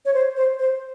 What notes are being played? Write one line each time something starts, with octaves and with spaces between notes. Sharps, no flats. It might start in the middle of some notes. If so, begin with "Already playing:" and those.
C#5
C5
C5
C5